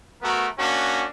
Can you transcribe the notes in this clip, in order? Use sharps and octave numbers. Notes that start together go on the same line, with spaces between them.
A3 B3 F#4 A#4
A#3 C#4 D4 F#4